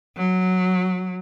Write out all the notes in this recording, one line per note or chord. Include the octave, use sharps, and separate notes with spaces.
F#3